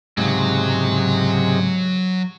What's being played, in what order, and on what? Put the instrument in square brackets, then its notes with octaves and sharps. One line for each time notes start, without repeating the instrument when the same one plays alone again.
[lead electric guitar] C#2 G#2 [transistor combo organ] C3 G#3 [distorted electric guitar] F#3